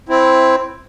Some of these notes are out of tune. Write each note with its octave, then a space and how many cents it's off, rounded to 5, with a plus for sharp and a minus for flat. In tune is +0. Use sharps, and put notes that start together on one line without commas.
C4 +0 E4 +0